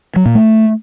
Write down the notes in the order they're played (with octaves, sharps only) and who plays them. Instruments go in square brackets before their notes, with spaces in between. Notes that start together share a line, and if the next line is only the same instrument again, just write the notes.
[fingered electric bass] F#3
A#2
A3